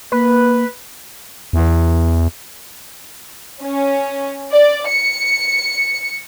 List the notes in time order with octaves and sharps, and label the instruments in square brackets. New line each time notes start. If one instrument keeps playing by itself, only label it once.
[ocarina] A#3 [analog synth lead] B4
[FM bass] E2
[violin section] C#4
D5
C#7